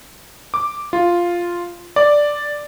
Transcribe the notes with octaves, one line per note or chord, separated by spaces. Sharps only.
D6
F4
D5